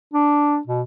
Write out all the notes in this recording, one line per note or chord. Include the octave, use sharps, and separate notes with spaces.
D4
B2